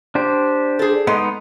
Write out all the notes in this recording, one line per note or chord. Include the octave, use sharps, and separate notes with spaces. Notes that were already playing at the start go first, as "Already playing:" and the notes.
D4 G4 C5
G#4 A4
G#3 B3 D#4 C6